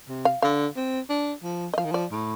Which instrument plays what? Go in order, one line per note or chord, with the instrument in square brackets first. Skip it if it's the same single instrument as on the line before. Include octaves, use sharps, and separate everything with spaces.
[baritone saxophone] C3
[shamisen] F5
[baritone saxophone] D3 [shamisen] F5
[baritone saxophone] C4
D4
F3
[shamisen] D#5
[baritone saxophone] F3 [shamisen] F5
[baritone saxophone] D#3
[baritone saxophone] F3 [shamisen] D5
[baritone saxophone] A2